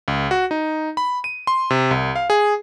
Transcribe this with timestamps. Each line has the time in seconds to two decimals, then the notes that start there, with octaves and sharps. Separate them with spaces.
0.08 C#2
0.31 F#4
0.51 D#4
0.97 B5
1.24 D#7
1.47 C6
1.70 C3
1.91 C2
2.16 F5
2.30 G#4